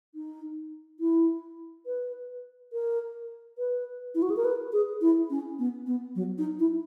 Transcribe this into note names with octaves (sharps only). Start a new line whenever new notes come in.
D#4
E4
B4
A#4
B4
E4
F#4
G#4
A#4
B4
G#4
E4
C#4
B3
B3
F#3
D#4
E4